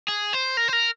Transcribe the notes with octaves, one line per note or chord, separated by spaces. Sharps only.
G#4
C5
A#4
C5
A#4